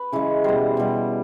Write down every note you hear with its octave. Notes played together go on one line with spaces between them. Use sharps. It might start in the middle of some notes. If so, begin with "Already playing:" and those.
Already playing: B4
C#3 E3 G#3
B2 G3 C5
B2 G3